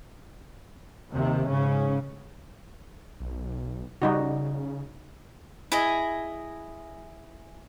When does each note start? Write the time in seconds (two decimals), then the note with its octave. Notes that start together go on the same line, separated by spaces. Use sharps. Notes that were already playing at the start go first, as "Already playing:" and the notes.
1.13 D#2 C3 D#3
1.48 G#2 C#3 C#4
3.20 B1
4.02 C#3 G3 D#4 F#4
5.72 E4 G#4 D#5 G#5